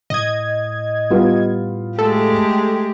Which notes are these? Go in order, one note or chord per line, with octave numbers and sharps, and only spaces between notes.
A2 D#5 G#6
G3 B3 F4
G#3 A3 G4 A4